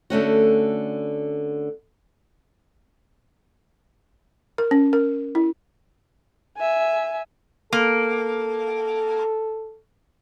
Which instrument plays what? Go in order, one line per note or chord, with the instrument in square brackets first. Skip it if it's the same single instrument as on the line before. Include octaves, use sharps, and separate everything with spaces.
[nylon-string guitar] D3 A3 C#4 F#4
[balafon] A#4
C#4
A#4
E4
[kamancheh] E5 G#5
[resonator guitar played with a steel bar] A#3 [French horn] A4